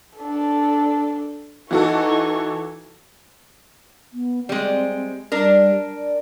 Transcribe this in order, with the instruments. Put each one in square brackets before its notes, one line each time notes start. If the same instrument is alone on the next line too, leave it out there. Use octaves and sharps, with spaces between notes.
[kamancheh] D4 A4
[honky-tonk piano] E3 F#4 A4 [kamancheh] D#4 C#6
[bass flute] B3
[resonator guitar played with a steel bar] G3 G#3 [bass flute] C4
[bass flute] G3 [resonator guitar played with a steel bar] D4 A#4
[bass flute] D5